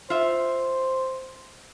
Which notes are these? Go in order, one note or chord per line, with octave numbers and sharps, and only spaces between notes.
F4 C5 E5